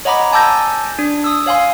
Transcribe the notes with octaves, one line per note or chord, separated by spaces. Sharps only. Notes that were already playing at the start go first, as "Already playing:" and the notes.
C#5 D#5 F#5 A#5 B5 D6
G#5 A5 D6 E6 G6 A#6
D4
D#6 E6
C#5 F5 G#5 C6